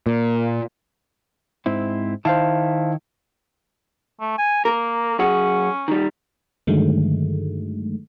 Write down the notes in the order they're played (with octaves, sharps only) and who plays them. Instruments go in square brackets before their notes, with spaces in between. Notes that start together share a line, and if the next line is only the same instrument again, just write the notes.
[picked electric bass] A#2
[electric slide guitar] G#2 C4 E4
[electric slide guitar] D#3 E4 [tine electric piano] C5 F5 A5
[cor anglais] A3
G#5
[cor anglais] A#3 [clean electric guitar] A#4
[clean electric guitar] F#2 G#4 F#5 [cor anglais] C#4
[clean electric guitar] D#3 G3
[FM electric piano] G2 D3 D#3 F#3 G#3 A3